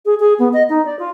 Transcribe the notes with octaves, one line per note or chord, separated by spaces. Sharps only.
G#4
G#4
B3
D#5
D#4
D5
F4